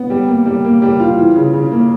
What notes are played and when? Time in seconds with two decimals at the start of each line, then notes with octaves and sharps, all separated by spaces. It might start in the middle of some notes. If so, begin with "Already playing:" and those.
Already playing: B3
0.10 G3
0.29 A#3
0.46 G3
0.65 A#3
0.82 G3
1.00 F4
1.18 E3
1.36 C#3
1.53 C#3
1.72 A#3